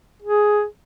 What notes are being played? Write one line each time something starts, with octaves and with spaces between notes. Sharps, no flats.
G#4